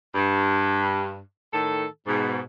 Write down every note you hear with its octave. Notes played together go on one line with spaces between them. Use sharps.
G2
A2 D#3 A4
G#2 B2